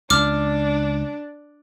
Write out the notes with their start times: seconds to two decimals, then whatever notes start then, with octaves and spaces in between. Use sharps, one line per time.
0.10 C#2 D4 D6 F6